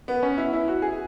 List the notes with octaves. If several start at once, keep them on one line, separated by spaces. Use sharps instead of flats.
B3
C#4
E4
E4
F#4
G#4